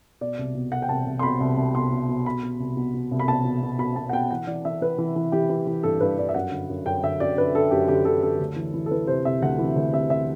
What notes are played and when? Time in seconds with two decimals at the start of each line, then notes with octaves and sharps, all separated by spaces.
0.21 B2 D5
0.39 C2
0.55 B2
0.72 B2 F#5
0.82 G5
0.89 C2 A5
1.06 C2
1.19 C6
1.23 B2 B5
1.40 C2
1.57 C2
1.75 B2 C6
1.92 B2
2.09 B2
2.26 B2 B5
2.43 B2
2.60 C2
2.77 B2
2.94 B2
3.11 C2
3.19 B5
3.28 B2 A5
3.45 B2
3.62 B2
3.79 B2 B5
3.96 B2 A5
4.09 F#5
4.13 B2 G5
4.31 E3 F#5
4.47 E3 D5
4.65 E3 E5
4.81 E3 B4
4.98 E3
5.16 E3
5.32 E3 G4
5.50 E3
5.67 E3
5.83 G2 A4
6.00 G2 B4
6.19 G2 D5
6.29 E5
6.34 F#2 F#5
6.52 D3
6.70 F#2
6.86 F#2 G5
7.03 D3 E5
7.20 F#2 D5
7.38 D3 B4
7.55 D3 A4
7.71 F#2 G4
7.88 D3 G4
8.05 D3 A4
8.23 D3 A4
8.40 D2
8.56 E3
8.74 E3
8.86 A4
8.91 E3 B4
9.07 C3 C5
9.25 C3 E5
9.42 D2 F#5
9.59 E3
9.76 D2
9.93 C3 E5
10.10 D2 E5